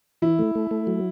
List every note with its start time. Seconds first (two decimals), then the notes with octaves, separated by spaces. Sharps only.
0.22 E3 E4
0.39 A3
0.55 A3
0.71 A3
0.87 F#3